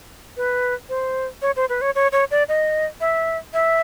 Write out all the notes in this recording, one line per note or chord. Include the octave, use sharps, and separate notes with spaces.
B4
C5
C#5
C5
B4
C#5
C#5
C#5
D5
D#5
E5
E5